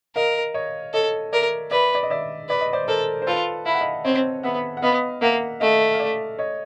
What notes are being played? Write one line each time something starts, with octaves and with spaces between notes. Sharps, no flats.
A#4 D#5 F5
C#5 D#5
A4 C#5 D#5
A#4 D5 E5
B4 D5 E5
D5
D#5
D5 E5
B4 D5
D#5
C5 D5
A4 A#4 C5
C5
F4 A4 B4
E4 F5
F#5
D#5 F5
C4 C#5 D#5
B3 E5 F#5
F#5
B3 D#5 F5
A#3 E5 F#5
A3 D#5 F5
F5
D5 E5
C#5 D#5